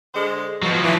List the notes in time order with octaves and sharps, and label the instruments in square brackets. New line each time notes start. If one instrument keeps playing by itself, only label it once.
[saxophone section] D3 G#3 C5
[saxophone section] B2 [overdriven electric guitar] F3 F#3
[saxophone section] E3